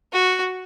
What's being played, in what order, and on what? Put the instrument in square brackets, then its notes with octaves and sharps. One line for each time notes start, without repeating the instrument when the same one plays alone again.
[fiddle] F#4